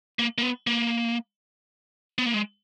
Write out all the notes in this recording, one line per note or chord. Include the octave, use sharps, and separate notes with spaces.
A#3
A#3
B3
A#3
B3
A#3
G#3